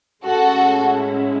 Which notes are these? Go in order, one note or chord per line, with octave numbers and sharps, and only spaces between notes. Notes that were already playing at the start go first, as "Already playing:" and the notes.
A2 G#3 C#4 E4 F#4 A4